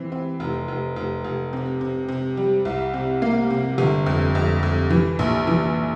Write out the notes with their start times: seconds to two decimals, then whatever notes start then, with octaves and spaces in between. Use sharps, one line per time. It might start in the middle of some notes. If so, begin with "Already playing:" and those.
Already playing: E3 C4
0.12 C4
0.40 F1
0.68 F1
0.96 F1
1.24 F1
1.53 C3
1.81 C3
2.09 C3
2.37 G3
2.65 C2
2.94 C3
3.22 A#3
3.50 C3
3.78 G1
4.06 F2
4.35 F2
4.63 F2
4.90 E3
5.19 A#1
5.47 E3